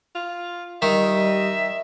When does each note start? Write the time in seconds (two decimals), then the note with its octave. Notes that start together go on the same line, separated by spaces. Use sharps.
0.15 F4
0.82 D#3 G3 D#5 E5